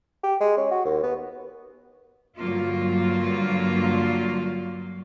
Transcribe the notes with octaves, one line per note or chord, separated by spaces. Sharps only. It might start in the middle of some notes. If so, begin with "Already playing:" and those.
G4
G#3
C#4
F#4
D#2
B3
G2 D3 F#3 A#3 F4